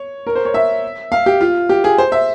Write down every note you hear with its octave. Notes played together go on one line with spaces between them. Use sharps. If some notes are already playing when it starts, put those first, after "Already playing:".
Already playing: C#5
A#4
C5
C#5
E5
F5
G4
F4
G4
G#4
C5
E5